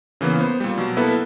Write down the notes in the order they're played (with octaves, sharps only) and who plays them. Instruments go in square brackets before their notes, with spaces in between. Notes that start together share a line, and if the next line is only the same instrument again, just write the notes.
[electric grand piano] C#3 E3 A#3 B3
B3 C5
A#2 G3
B2 F#3
A#3 B3 E4 A4 B4